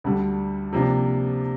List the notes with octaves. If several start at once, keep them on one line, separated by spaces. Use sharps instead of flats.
D2 D3 G3
C3 F3 A#3 D4